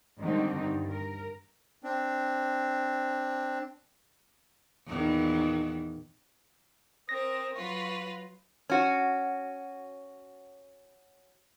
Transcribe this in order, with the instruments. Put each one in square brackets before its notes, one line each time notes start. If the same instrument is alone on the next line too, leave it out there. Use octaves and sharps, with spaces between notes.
[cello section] G#2 D3 D#3 G3 C4 D#4
G2
A#4
[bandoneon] C4 D4
[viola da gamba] E2 A#2 D#3
[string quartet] C4 A#4 [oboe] D#6 [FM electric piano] A#6
[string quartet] F#3 F4 B4 [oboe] C#6
[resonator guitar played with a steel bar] C#4 F#4